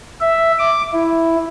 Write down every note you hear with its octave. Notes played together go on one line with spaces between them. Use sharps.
E5
D6
E4